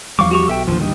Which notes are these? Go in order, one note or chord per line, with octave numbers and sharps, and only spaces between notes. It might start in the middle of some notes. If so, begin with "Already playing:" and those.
E2 F3 G3 F5 C#6 D6
F#4 G4 C#6
B1 A4 E5 G5
A1 D#2 D3 F3
G3 D#4